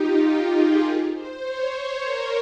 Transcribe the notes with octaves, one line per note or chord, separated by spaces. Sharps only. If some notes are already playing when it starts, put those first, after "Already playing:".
Already playing: D#4 F4 G4
F4
G#4
A#4
C5
C#5
C5
A#4